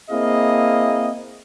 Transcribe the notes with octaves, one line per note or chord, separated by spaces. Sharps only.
A#3 C4 E4 G#4 D#5 F5